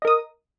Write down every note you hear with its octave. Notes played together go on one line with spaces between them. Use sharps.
A#4 D#5 D#6